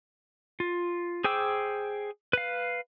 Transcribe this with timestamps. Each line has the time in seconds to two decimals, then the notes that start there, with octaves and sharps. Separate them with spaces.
0.60 F4
1.24 G#4 C5 G5 D6 E6
2.33 B4 F5